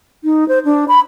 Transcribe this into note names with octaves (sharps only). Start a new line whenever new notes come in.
D#4
C5
D4
B5